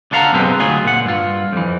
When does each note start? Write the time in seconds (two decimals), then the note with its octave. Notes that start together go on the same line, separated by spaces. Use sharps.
0.11 C#2 D3 A4 F5 F#5 A#5
0.33 B1 F#2 C3 G#3 C4 B4
0.59 D2 F#3 F4 G#4
0.85 A#2 F#5
1.05 G2 F4
1.52 F2 E3